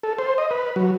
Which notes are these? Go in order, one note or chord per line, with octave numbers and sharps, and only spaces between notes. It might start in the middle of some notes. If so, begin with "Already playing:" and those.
A4
C5
D#5
B4
F#3